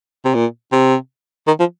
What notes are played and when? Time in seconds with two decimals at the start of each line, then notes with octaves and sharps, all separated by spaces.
0.25 C3
0.34 A#2
0.72 C3
1.47 D#3
1.60 F3